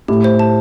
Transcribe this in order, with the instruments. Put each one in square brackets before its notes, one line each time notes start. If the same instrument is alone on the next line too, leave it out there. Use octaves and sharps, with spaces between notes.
[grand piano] A2 [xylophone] G4
[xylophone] C5
A5